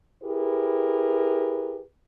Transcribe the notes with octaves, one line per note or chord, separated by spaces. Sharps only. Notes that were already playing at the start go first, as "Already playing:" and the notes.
E4 G4 G#4 A#4 B4